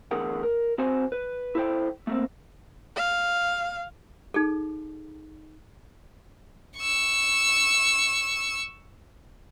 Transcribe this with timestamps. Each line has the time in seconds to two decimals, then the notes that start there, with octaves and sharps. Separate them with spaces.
0.11 E2 A2 D3 G#4 A#4 F#5
0.43 A#4
0.78 C4 F#4 C5 F#5 G#5
1.12 B4
1.55 E4 A4 C5 G5
2.07 A3 A#3 C4
2.96 F5
4.34 D#4 G#4 A4
6.79 C#6 E6